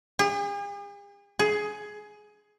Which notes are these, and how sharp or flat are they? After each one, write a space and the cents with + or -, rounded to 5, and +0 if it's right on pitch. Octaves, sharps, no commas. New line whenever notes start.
G#4 -45
G#4 +15